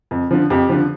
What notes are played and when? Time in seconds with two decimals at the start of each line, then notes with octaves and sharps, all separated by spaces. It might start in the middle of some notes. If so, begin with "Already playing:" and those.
0.11 F2
0.31 D3 F3
0.50 F2 G4
0.69 D3 F3